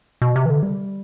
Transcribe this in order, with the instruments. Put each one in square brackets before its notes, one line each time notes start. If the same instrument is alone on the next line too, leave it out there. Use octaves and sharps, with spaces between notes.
[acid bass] B2
C3
E3
D3
G3